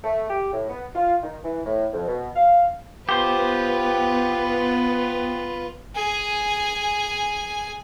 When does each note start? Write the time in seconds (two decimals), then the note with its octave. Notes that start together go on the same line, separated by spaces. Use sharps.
0.04 A3
0.30 G4
0.53 A2
0.69 B3
0.95 F4
1.23 D#3
1.44 E3
1.66 A2
1.93 F2
2.08 B2
2.36 F5
3.09 B3 F4 G4 B4 C5
5.95 G#4 G#5